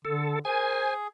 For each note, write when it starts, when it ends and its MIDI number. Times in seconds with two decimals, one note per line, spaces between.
0.05 0.38 50
0.05 0.39 69
0.45 1.07 68
0.45 0.86 70
0.45 0.94 72
0.45 0.94 80